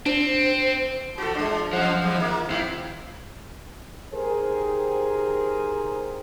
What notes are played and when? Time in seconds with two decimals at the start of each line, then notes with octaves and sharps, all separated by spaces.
0.06 C4 D4 C5
1.18 F3 F#4 A4 A5 C6
1.35 G#3 D4
1.73 F2 F3 C5 F#5
2.02 G3 G#3 C4
2.16 D#3 A#3
2.50 D#2 C4 E4 F4
4.13 D#4 G4 G#4 A#4 C5